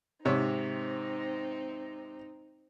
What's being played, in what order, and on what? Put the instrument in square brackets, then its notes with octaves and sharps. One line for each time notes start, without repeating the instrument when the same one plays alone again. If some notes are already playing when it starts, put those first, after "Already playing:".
[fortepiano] G#2 C3 C#5 [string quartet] C4 D#4